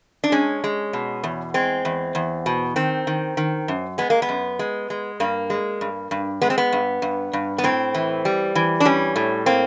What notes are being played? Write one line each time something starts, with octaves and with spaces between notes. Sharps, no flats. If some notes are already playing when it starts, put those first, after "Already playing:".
D4
G#3 C#4
G#3
B2
E2
G#3 C4
E2
E2
B2
D#3 C4
D#3
D#3
F#2
G#3 B3
A#3
B3
F#2
G#3
G#3
G2 A#3
G#3
G2
G2
G#3 B3
C4
B3
G2
G2
G2
B3
A2 C4
E3
G3
E3
D4
G3 C#4
A2
A#3 C4